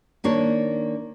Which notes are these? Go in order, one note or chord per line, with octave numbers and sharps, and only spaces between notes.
D#3 A#3 D4 C#5